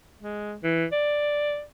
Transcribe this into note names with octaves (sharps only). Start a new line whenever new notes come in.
G#3
E3
D5